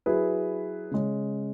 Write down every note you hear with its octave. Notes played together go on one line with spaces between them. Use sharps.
F#3 E4 G#4 B4
C#3 G#3 C#4